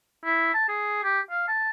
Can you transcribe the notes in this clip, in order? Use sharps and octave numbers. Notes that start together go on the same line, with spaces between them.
E4
A5
G#4
G4
F5
A5